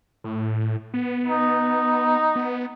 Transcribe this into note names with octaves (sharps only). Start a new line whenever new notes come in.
A2
B3
D#4
B3